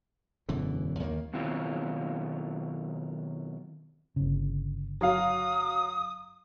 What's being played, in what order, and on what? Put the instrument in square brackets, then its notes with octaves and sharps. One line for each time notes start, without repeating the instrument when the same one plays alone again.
[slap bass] E1 F#2 D3 E3
D#2 D#3 G3 A#3
[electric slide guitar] B2 D#3 F#3 C4 E4 F4
[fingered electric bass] G1 C#3
[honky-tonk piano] F#3 F5 [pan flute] D#6